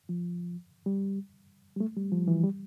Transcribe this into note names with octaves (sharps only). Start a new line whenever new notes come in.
F3
G3
G3
A3
G3
F3
E3
G3